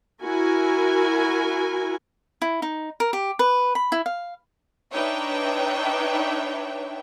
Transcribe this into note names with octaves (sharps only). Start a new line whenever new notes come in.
E4 F#4 A#4 G#5
E4
D#4
A#4
G4
B4
B5
E4
F5
D4 D#4 B4 C#5 E5 G5